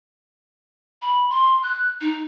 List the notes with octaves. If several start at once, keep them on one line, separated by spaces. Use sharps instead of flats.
B5
C6
F#6
D#4